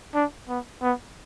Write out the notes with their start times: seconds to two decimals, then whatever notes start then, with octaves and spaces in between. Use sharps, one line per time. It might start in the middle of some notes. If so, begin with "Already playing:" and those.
0.14 D4
0.49 B3
0.82 B3